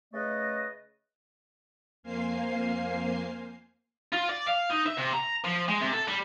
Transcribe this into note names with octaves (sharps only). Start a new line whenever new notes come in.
C#3 A3 B4 D#5
F2 A#3 C5 F5 G#5 C7
F4
D5
F5
D#4
E5
C3
A#5
F3
G#3
C3
A4
G3